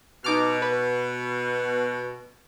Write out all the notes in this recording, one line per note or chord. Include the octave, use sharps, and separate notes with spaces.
B2 D#4 D6 F6
B4